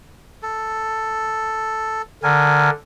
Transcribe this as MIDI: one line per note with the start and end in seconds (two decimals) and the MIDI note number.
0.43 2.02 69
2.23 2.70 50
2.23 2.70 70
2.23 2.70 80